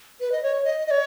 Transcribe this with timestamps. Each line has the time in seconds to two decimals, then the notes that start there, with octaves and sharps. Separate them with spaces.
0.21 B4
0.32 D#5
0.43 C#5
0.65 D#5
0.87 D#5
0.91 C#5